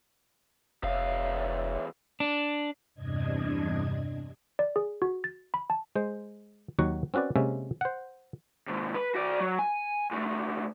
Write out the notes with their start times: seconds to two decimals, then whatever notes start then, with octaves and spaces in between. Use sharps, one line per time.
0.83 F1 E2 C#5 E5 F5
2.20 D4
2.94 E2 G2 C3 D4 D#5 G#6
4.59 D5
4.76 G#4
5.02 F#4
5.24 A6
5.54 B5
5.70 A5
5.96 G#3 C5
6.79 D#2 D#3 F#3 F#4 F#5
7.14 C4 C#4 F#4 B4 D5
7.36 C3 G#3 A#3 C#4 E5
7.81 C5 F#5
8.68 D#2 G#2
8.95 B4
9.15 F#4 D5
9.41 F#3
9.59 G#5
10.11 C#2 A3